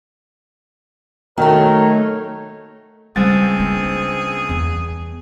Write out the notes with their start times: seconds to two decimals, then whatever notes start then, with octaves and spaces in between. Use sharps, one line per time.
1.38 D#3 F#3 A3 D#4 A#4 C#5
3.16 C#2 G3 G#3 C4 G#4 A6
3.59 A#3 D4
4.49 E2